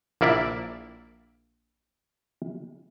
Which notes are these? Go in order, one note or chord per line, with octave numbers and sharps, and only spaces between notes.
A#1 A#3 E4 D5 E5